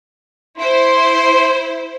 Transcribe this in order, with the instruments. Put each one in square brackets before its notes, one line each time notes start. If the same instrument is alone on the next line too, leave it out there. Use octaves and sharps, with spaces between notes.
[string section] E4 C5 [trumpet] C6